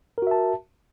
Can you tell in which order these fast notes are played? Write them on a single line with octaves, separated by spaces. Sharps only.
A#4 F#4 E5 A5